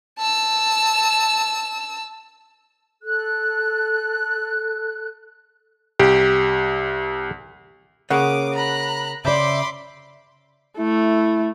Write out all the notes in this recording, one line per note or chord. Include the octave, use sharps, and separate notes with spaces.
A5 E6
A4 F#6
C2 G4
C#3 A#3 F#5 D6 D#6
A#5 B5 F#6
C#3 C5 D5 E5 B5 C6 D6
A3 E4